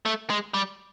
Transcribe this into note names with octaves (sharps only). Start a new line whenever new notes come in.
A3
G#3
G3